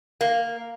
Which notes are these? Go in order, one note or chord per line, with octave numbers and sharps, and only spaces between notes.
A#3